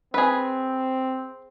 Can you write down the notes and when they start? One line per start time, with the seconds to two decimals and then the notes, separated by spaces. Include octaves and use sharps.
0.14 C4 G#4 B4